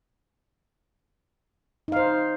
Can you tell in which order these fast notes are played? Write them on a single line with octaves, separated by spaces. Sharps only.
D#4 F5 C5